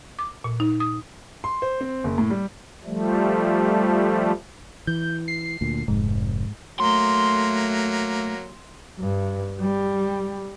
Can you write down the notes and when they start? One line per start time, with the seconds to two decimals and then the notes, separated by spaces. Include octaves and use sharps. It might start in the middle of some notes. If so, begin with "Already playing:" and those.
0.19 D6
0.44 A#2
0.60 D#4
0.80 D#6
1.44 C6
1.62 C5
1.81 C4
2.04 F#1
2.18 A2
2.30 G3
2.84 F3 G3 A3
4.87 E3 G6
5.28 C7
5.61 D2 A#2
5.88 F1 G#2
6.80 F#3 A3 A#3 C6
8.99 G2
9.60 G3